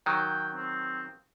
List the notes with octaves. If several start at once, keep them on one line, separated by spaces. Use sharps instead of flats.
D#3 F#3 G5
C4